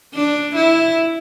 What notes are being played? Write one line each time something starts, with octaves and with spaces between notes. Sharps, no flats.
D4
E4